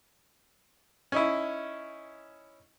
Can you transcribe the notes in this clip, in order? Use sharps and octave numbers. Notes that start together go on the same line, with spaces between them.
C#4 D#4 E4